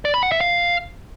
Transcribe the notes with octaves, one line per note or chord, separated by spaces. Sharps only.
D5
B5
F#5
E5
F5